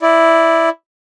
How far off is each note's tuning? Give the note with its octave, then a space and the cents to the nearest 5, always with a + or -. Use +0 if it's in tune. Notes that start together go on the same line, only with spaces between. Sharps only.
E4 +0 D5 +0